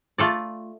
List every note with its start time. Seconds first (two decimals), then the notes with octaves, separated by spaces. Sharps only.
0.18 A3 F4 A4 D5